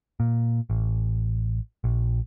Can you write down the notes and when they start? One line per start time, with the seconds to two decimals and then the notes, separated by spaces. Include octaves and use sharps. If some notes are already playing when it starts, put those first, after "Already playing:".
0.20 A#2
0.70 A1
1.84 A#1